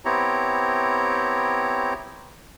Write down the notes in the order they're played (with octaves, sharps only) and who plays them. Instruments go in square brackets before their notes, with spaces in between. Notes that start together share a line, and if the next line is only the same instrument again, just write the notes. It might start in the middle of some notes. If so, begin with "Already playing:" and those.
[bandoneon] B3 C4 E4 G4 C#5 A#5